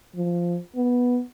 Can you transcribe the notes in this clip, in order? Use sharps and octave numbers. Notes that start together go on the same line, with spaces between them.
F3
B3